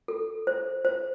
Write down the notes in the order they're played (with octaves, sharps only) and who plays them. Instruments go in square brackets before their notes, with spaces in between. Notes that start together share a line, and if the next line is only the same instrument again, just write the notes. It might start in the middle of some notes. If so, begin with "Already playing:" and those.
[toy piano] A4
C5
C5